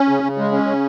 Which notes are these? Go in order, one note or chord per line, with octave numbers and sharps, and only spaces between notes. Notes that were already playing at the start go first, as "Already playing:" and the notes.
Already playing: C#4
C#3
C#3
G#3
C#4
C#3